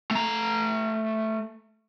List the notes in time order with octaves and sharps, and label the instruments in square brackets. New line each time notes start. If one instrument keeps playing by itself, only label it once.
[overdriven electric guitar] A3 A#5